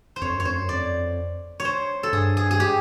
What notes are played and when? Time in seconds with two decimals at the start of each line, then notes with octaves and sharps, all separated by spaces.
0.16 C5
0.22 F2 C#5
0.34 F#2
0.40 C#5
0.45 F2 C5
0.58 F#2
0.69 F2 D5
1.60 C#5
1.65 C5
2.03 A4
2.13 G2 G#4
2.37 G#4
2.51 G#4
2.60 G4